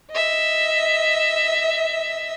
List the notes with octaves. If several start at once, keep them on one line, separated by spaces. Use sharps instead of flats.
D#5 E5